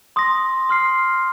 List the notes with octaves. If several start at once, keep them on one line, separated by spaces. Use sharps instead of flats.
C6 D#6 A#6
C6 F6 C7